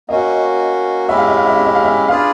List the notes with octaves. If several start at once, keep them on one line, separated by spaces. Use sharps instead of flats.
A#3 C#4 F#4 D#5
G#3 C#4 E4 G4 E5
F5
E5
F5
E5
F5
E5
F5
E5
D4 F4 G#4 B4 D5 F5